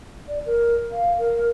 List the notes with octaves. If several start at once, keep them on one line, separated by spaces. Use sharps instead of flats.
D5
A#4
F5
A#4